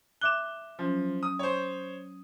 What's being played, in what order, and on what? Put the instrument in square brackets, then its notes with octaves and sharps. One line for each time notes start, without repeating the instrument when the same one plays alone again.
[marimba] E5 D6 F#6 [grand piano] E7 G7
[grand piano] F3 [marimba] F#3 C#4
[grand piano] D#6
C5 C#5